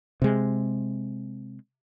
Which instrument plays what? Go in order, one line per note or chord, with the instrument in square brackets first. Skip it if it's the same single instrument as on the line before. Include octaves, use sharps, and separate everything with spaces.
[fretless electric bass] C3 G#3